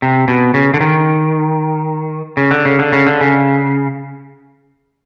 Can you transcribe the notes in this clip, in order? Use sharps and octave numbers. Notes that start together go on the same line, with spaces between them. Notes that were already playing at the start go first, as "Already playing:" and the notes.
C3
B2
C#3
D3
D#3
C#3
D3
C#3
D3
C#3
D3
C#3